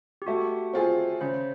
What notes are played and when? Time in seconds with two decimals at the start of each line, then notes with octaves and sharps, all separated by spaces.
0.22 G4
0.27 A3 F#4
0.73 C4 F4 G#4
1.21 C#3 C5